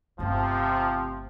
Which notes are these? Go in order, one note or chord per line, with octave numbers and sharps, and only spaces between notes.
G1 C3 F3 A3